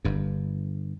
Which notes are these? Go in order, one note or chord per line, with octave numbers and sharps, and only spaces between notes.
G1 G2